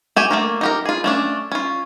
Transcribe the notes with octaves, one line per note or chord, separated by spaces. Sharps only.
F#4 G4 G#5
A3 A#3 A#4
D#4 G4 A#4
F4 G#4
A3 C#4 D4
C#4 F4